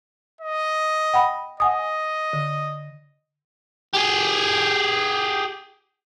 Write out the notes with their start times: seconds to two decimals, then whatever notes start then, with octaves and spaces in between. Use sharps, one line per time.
0.41 D#5
1.14 F#5 G5 B5
1.60 D#5 F#5 G#5 D#6
2.33 D3
3.94 G4 G#4